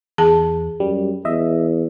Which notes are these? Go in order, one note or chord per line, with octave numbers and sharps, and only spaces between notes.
E2 G#4 A5
F#2 G3
E2 D#5 E5